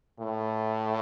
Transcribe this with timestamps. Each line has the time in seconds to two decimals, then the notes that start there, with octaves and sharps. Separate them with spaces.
0.19 A2